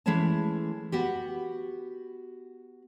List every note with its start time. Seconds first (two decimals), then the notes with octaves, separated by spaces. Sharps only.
0.06 E3 G#3 A3 C#4 C#5 A5
0.92 B3 F#4 G4